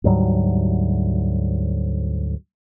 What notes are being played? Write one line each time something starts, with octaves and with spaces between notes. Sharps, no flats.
D2 G#2 F#3 G3